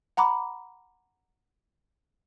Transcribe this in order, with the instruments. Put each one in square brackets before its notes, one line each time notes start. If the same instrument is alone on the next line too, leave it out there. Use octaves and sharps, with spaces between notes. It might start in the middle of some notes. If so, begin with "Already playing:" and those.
[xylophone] F#5 A#5 B5 D6